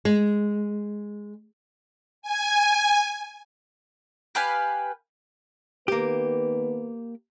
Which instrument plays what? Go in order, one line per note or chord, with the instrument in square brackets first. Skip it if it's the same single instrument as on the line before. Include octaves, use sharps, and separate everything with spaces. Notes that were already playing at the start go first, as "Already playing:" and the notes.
[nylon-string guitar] G#3
[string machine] G#5
[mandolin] G4 B4 F5 G#5
[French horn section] D#3 B3 B4 [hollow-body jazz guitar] A#3 G4